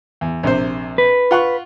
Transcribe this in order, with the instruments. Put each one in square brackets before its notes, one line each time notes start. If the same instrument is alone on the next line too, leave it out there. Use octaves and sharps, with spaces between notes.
[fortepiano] E2
A#1 C3 C5
[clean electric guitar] B4
[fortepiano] F4 F#5 C#6